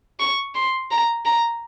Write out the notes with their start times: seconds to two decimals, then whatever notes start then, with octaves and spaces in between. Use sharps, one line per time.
0.20 C#6
0.55 C6
0.91 A#5
1.25 A#5